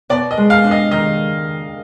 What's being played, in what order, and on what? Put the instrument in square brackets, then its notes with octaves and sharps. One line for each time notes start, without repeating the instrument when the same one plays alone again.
[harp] B2 [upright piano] D5
[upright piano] D#5
[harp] G#3
[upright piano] F5
[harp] D4
[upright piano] D#5
[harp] D#3 [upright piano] D#5